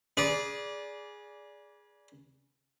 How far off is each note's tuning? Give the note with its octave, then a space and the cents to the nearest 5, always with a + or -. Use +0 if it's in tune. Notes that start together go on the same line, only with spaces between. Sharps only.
G#4 +0 B4 -35 D5 -15